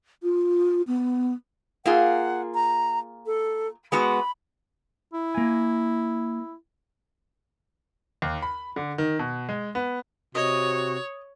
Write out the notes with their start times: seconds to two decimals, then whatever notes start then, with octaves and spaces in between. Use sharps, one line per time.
0.23 F4
0.87 B3
1.85 A#3 F4 G#4 F#5
2.54 A#5
3.26 A4
3.92 G#3 B3 F#4 B5
5.13 E4
5.35 A#3 G#5
8.22 D#2
8.42 B5
8.76 D3
8.98 D#3
9.19 B2
9.49 G#3
9.75 B3
10.35 C3 F#4 C#5 D#5